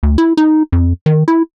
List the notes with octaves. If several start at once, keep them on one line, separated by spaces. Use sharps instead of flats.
D2
E4
D#4
F2
D#3
E4